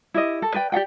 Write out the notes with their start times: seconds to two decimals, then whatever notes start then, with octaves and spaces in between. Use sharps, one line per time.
0.14 E4 G4 D#5
0.42 A4
0.54 B4 D5 G5
0.72 G4 D5 F#5 G5